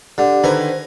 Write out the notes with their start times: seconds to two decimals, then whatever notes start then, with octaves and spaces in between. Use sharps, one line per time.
0.18 D3 G4
0.44 D3 D#3 B4 C5 G#5 A#5